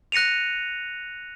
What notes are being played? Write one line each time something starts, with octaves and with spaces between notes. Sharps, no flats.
F#6 A#6 C#7 D#7 F7